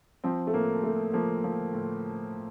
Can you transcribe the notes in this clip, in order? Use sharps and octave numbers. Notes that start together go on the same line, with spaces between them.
F3 C4
A3
A2 A#3
A2 A3
F3 A#3
F3
A2